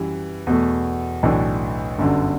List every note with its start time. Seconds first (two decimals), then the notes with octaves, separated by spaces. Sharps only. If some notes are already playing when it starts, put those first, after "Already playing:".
Already playing: F#2 E3 G3
0.47 E2 B2 A3
1.23 B1 A2 E3 A3 D4
1.98 G1 F#2 D3